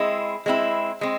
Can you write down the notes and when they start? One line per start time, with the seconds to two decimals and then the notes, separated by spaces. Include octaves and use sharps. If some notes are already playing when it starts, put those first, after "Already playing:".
Already playing: G#3 C4 E4
0.46 G#3 C4 E4
1.01 G#3 C4